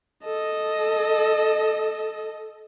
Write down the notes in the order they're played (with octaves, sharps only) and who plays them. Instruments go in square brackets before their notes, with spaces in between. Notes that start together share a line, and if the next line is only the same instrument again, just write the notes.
[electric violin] A4 D#5